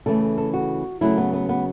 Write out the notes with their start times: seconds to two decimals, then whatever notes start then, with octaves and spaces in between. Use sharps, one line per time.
0.06 C#3 E3 A3 A4
0.38 A4
0.54 F#4
1.01 C#3 F#3 A3 E4
1.18 B3
1.33 B3
1.49 B3